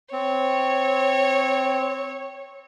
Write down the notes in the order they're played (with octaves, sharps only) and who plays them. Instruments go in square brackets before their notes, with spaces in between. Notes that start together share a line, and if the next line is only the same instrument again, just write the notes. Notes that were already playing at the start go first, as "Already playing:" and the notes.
[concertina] C4 [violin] C#5